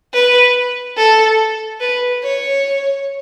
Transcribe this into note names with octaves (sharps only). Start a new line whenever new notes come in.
B4
A4
B4
C#5